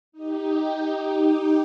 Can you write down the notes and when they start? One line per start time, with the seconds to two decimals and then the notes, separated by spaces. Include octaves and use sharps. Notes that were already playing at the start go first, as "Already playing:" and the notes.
0.12 D#4 G4